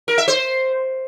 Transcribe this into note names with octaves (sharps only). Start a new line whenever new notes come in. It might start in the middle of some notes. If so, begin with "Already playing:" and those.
A#4
E5
C5